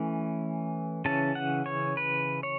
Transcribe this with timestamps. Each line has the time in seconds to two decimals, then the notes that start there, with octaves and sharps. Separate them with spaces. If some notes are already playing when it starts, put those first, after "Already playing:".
Already playing: E3 A3 C#4
1.05 C#3 E3 C#4 A5
1.35 F#5
1.66 C#5
1.97 B4
2.43 C#5